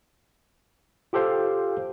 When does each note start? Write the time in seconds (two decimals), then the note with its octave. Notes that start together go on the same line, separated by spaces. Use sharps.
1.13 F4 G4 A4 C5 F5 G5